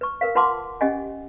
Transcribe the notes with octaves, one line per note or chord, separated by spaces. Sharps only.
B4 C#6
A#4 B4 F5
F4 B4 F#5 A5 C6 D6
C#4 G4 D#5 F#5 G#5